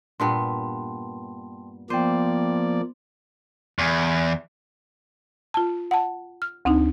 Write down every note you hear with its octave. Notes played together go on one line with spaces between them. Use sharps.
G2 A#2 B3 G5 A5 C6
F3 A#3 B3 C5 D5 G5 D6
E2
F4 A5
F#5 A5
F6
D2 C4 D4 D#4